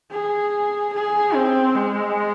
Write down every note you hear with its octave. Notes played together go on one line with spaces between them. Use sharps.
G#4
G#4
C4
G#3